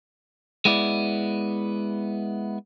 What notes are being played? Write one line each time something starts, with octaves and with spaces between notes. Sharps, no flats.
G#3 B3 E4 D5